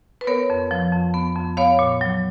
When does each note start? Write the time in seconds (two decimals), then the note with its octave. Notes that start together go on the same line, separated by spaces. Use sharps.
0.21 B4
0.27 B3 A#4 C#5
0.50 F2
0.71 F3
0.92 F2
1.14 B3
1.36 F2
1.57 B3 C#5 F5
1.79 A#2
2.01 F#3